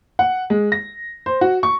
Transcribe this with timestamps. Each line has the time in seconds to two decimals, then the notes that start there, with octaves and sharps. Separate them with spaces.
0.19 F#5
0.50 G#3
0.72 A#6
1.26 C5
1.41 F#4
1.63 C#6